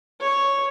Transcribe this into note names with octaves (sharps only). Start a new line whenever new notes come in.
C#5